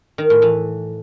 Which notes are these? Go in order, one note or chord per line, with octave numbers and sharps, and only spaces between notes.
D#3
A2
E3